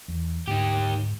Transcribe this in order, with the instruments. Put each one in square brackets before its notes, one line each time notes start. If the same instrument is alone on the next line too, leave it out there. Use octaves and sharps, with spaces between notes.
[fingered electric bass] E2
[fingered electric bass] D2 [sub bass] G#2 [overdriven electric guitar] D#3 G4